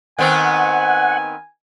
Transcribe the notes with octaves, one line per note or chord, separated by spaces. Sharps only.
D#3 B3 C4 F#5 G#5